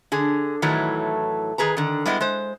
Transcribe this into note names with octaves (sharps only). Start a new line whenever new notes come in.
D3 G#4
A2 D#3 E3 F#3 A3
D#3 G#4 B4 A#5
D3 D#3
G3 G#3 B3 E4 D#5
G#3 C5